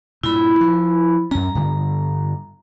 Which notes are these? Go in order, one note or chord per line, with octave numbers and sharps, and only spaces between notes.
G2 A#2 E4 B5
F3
F#2 C#4 A#5
G2 D3